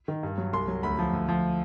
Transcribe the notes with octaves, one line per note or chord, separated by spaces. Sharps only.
D#3
G2
F#3
C2 C6
F#3
D2 B5
F3
D2
F3